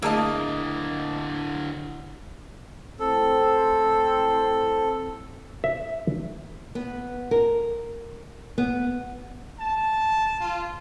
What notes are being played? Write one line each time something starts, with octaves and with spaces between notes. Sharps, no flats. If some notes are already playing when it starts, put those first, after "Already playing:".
D3 A3 A#3 E4 G#4 D#5 A5
A2 C4 A4
E5
B3
A#4
B3
A5
F4